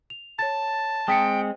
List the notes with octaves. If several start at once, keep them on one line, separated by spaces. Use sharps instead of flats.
F7
C#5 A5 A6
G#3 C4 G5 D#6 B6 C#7